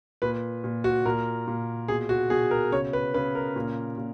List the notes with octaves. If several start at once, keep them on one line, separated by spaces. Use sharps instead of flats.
A#2 B4
A#2
F#4
A#2 A#4
A#2
B2 G#4
F#4
B2 G#4
A#4
C#3 C#5
B4
C#3 B4
A#4
A#2
A#2